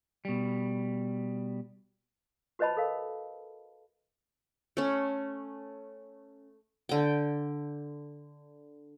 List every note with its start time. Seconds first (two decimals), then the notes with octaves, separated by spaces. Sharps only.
0.25 B2 G3
2.59 F#4 B4 C5 D#5 A5 B5
2.77 A4 A#4 F5
4.77 A3 C#4
6.89 D3 G5